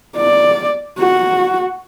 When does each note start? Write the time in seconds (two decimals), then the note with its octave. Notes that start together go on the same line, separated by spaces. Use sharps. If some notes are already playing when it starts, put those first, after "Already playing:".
0.17 D5
0.99 F#4